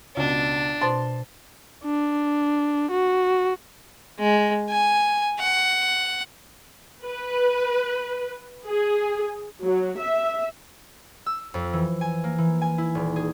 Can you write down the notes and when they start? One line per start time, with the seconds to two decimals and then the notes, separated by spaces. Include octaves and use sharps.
0.17 C#2 B2 D4
0.81 B2 C5 A5 C6 A6
1.84 D4
2.91 F#4
4.19 G#3
4.69 G#5
5.40 F#5
7.03 B4
8.67 G#4
9.65 F#3
9.98 E5
11.26 E6
11.54 F2
11.73 E3
12.01 G#5
12.24 A#3
12.38 E3
12.61 G#5
12.78 E4
12.95 D#1
13.16 G#4